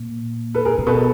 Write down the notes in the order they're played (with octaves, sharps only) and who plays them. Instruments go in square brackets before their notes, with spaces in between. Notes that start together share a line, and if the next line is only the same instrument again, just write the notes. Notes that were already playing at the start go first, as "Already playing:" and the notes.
Already playing: [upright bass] A#2
[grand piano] A4 B4
G#4 A#4
[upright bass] A#2
[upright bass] B2 [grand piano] A4 B4